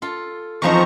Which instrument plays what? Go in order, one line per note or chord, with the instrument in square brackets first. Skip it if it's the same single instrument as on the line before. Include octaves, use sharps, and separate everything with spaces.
[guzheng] F4 A4
[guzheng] E2 C4 D#4 [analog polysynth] F3 A#5 C#6